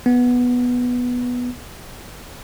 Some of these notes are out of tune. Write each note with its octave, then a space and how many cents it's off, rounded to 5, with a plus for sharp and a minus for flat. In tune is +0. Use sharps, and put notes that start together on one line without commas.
B3 -5